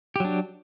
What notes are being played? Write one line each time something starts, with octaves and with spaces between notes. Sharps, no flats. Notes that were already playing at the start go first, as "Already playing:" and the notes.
F#3 D4 G4